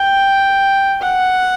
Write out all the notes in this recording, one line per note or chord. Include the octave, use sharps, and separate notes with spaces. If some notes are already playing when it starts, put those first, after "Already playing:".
Already playing: G5
F#5